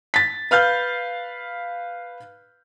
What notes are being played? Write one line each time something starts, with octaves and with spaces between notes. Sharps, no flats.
A6 B6
B4 F5 F6 G6